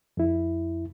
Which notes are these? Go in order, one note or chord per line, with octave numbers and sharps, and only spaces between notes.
F2 E4